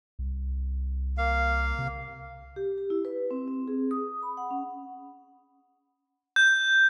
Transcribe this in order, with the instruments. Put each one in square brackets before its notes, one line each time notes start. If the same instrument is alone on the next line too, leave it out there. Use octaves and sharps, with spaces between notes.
[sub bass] C2
[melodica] A#3 F5
[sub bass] C3
[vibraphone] G4
G4
E4
B4
C4
C4
G#4
D#6
B5
F#5
C#4
[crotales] G6